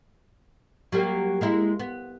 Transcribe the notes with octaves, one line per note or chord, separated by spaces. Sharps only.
F#3 G3 A#3
G#3 A#3 E4
B3